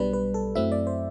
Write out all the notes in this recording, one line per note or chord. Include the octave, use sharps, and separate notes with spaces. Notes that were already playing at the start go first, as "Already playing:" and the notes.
Already playing: B1 B2 G3 D4 B4
B4
A4
F#2 F#3 A3 C4 E4 E5
D5
C5